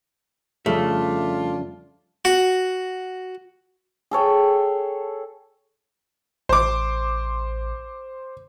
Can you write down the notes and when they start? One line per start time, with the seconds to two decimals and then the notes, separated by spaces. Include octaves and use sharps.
0.66 F2 C#3 F3 G3 A3 D4 F4
2.25 F#4
4.11 G#4 A4 C#5 G5
6.49 A1 C5 D6